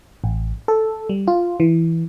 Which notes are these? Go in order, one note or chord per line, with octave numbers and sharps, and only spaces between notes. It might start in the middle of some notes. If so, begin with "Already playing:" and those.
A1
A4
G3
F4
E3